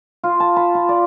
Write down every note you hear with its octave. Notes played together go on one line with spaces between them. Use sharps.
F4
A5
B5
F4
D5